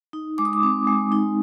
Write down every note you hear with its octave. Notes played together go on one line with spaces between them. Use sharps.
D#4
G#3 D6
D#6
D6
C4
G#3
D#4